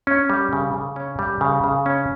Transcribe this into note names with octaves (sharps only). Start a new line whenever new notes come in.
C#4
G3
C#3
C#3
C#4
G3
C#3
C#3
C#4